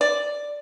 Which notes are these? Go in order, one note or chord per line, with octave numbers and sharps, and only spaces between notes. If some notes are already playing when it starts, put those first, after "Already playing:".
D5